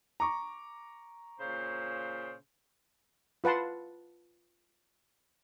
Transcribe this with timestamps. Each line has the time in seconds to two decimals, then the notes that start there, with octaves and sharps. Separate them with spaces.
0.20 A#5 C#6 D6
1.39 A#2 C#3 C5
3.44 F4 B4 F#5 A5 C6